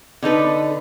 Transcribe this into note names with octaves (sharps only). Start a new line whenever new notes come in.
D3 D#4 A4 B4